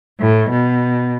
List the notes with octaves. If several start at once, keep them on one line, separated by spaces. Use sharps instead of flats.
A2
B2